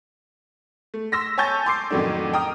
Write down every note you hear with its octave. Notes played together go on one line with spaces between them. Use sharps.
A3
C6 E6 A#6 B6
C#5 G#5 A5 C#6 G6 A6
C6 D6 C7
F2 A2 D#3 F#3 A3 D4
G5 A#5 D#6 F6